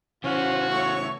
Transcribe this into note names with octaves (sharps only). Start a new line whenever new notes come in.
C#3 E3 C#4 F4 F#4 C5
A3 C#5 C#6